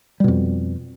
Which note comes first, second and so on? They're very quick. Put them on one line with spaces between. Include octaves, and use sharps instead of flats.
G3 B2 F2